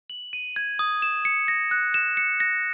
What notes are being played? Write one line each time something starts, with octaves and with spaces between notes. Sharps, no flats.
F#7
D#7
G#6
D#6
E7
C#7
A#6
F#6
E7
C#7
A#6